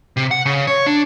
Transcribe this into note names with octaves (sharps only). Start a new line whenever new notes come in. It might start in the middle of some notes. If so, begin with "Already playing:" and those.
C3
F#5
C#3
C#5
D4